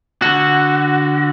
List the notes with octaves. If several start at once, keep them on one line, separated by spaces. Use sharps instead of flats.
D3 F#4